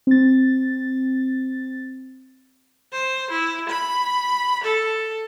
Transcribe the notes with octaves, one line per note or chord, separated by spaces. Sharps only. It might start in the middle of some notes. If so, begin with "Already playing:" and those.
C4 A6
C5
E4
B5
A4